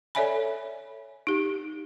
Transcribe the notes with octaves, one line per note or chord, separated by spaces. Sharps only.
A4 C#5 D5 E5 G#5 B5
D#4 G4